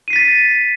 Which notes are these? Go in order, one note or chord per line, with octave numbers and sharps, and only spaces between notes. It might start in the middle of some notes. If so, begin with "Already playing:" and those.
A6 B6 C7 D#7